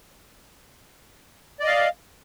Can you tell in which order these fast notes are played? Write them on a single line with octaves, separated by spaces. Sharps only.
D5 D#5 F5